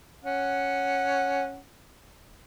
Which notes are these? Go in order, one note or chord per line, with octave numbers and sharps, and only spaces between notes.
C#4 F#5